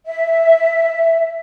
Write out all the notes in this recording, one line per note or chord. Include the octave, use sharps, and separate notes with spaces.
E5